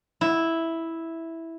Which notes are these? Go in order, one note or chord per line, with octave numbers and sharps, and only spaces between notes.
E4